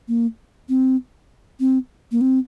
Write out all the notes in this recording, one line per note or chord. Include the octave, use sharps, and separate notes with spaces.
A#3
C4
C4
A#3
C4